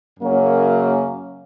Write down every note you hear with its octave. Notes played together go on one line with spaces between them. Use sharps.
F#2 C#3 F#3 A#3 C#4